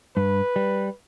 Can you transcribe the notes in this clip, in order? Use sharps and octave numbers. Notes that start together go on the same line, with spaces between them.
G2 B4
G3